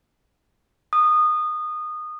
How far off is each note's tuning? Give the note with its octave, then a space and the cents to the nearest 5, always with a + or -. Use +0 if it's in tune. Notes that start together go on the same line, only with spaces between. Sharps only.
D#6 -20